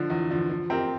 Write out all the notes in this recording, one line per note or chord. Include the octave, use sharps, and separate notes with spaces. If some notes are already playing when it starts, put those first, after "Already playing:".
Already playing: D3 F3
E2
D3 F3
F3
C4 G4 A#4